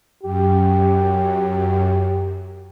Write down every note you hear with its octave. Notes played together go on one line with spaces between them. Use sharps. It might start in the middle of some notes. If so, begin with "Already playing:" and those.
F#2 G4